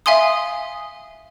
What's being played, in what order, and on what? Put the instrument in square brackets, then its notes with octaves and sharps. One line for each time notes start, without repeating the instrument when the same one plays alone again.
[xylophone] E5 F5 G#5 C6 D#6